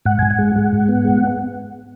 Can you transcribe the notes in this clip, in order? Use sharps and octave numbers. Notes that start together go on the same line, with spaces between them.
G#2 F#5
G#2 G#5
F#5
G#3
G#3
G#2
B3
G#3